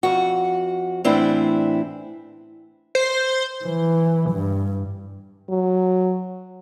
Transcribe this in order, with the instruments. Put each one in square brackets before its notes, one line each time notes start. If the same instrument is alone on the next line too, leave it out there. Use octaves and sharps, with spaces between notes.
[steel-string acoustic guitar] F2 F#4
A2 E3 C4 D4 E4
[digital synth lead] C5
[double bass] E3
G2
[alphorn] F#3